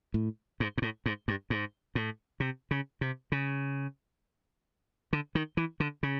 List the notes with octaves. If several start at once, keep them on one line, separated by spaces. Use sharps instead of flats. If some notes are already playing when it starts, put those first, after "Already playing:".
A2
G#2
G#2
A2
G#2
G2
G#2
A2
C3
C#3
C3
C#3
D3
D#3
E3
D3
C#3